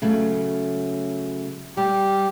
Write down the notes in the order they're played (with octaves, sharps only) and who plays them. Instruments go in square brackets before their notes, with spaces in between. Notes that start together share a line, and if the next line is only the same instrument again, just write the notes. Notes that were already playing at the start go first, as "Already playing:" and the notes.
[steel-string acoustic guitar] C#3 F#3 A3
[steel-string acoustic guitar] G3 [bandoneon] G4